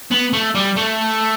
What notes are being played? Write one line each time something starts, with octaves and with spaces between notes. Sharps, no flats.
B3
A3
G3
A3